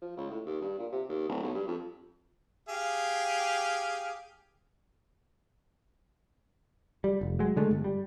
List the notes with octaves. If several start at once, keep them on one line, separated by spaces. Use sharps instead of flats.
F3
C#2
A2
D#2
G2
A#2
C3
D#2
D1
B1
G2
F2
G4 G#4 F5
G3
F1
F#3 G#3
D3 G#3 A3
G1
G3